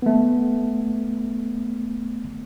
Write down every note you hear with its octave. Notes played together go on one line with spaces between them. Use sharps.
A3 B3